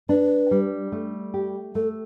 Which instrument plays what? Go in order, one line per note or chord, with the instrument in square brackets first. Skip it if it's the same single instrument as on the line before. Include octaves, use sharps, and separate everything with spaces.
[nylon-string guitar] D4 [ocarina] B4
[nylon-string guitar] G3
A3
G4
[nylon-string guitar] A3 [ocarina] A4